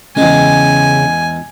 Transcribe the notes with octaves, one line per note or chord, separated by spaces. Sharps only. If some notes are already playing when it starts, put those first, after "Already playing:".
E2 C#3 G#3 C#4 G5 G#5